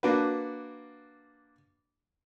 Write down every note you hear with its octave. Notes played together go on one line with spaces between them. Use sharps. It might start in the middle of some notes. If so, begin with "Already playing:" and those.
A#3 D4 F#4 B4